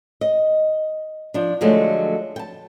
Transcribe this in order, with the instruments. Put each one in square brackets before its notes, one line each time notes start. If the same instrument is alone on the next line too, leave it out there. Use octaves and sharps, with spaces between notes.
[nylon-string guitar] D#5
F3 D4
D3 F3 F#3 G#3 A3
G5 A5